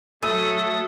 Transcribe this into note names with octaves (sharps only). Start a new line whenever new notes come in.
F#3 A3 A4 D#6 E6 D#7